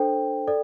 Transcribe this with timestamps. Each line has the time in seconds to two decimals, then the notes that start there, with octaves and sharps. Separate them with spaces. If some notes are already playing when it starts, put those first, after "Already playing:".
Already playing: D4 A4 C5 G5
0.48 A4 D5